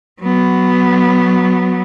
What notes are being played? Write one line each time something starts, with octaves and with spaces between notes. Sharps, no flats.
F#3 B3